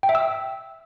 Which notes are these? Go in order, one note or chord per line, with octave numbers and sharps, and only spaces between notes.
G5
E5
E6